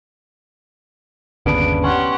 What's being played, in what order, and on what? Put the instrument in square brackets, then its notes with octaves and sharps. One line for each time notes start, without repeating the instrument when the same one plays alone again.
[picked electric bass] G1 D#2 C#3 [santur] B3 D4 [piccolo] D7
[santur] C#4 [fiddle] G4 F#5 [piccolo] C6